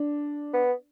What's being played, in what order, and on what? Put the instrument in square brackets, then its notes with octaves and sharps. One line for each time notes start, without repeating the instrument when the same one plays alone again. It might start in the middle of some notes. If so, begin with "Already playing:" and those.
Already playing: [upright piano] D4
[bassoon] B3